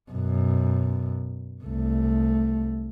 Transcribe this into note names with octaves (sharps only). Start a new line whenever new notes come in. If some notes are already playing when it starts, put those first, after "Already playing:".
F#2 B2
C2 A3